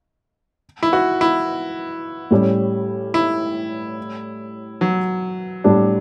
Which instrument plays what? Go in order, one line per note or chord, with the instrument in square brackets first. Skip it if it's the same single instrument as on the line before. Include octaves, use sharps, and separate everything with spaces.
[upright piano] E4
F#4
E4
[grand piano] A2 G3 C#4 G4
[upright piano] E4
F#3
[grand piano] A2 G3 D4